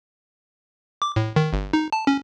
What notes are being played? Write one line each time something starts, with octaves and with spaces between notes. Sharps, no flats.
D6
A2
D#3
G1
D#4
A5
C#4